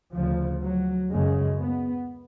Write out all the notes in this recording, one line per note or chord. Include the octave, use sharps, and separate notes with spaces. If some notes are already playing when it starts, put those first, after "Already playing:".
D2 C#3 F3
F#3
F#2 C#3 G#3
B3